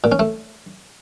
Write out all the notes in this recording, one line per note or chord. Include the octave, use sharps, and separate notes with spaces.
A#2
C#4
A3